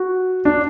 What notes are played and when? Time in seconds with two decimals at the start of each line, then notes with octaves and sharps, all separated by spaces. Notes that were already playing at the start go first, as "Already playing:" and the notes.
Already playing: F#4
0.45 D4